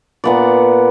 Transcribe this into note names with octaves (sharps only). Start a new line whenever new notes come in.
A#2 B3 D5